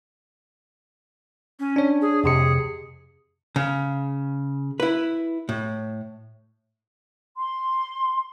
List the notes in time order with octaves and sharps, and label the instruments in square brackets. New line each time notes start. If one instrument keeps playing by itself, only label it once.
[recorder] C#4
[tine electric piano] D4 C#5
[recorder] G#4
[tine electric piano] F2 C3 C#7 [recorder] G#4
[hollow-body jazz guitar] C#3
E4 B4
A2
[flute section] C6